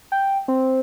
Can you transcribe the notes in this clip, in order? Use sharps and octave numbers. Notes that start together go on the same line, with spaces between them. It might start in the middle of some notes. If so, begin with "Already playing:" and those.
G5
C4